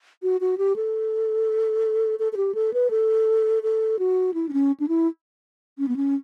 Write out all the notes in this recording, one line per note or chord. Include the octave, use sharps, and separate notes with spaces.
F#4
F#4
G4
A4
A4
A4
G4
A4
B4
A4
A4
F#4
E4
D4
C#4
D4
E4
C#4
B3
C#4